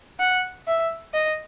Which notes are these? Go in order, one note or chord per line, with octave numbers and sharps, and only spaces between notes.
F#5
E5
D#5